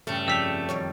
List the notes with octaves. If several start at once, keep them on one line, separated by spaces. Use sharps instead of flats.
G2 C#3 A3 C#4
F2 G3 E6 B6 F7
F#2 D#3 C#5